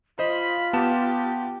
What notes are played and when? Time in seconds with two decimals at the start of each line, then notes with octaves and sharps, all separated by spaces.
0.19 F4 C5 D#5 B5
0.73 B3 G4 A5 E7